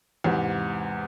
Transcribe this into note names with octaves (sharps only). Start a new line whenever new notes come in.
E2 G#2 C3